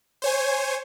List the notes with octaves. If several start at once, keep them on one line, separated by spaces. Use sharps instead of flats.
C5 C#5 G#5